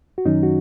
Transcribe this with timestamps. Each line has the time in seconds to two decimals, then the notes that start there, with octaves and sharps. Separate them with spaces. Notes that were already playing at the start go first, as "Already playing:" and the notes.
0.18 F#4
0.25 F#2 D#3 F#3 C#4 D#4
0.43 F#4